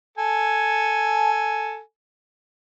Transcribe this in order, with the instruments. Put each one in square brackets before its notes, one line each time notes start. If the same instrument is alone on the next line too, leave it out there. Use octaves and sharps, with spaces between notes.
[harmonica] A4 G#5